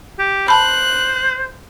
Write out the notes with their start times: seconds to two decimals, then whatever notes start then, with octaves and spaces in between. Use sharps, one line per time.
0.19 G4
0.48 C5 A5 B5 F#6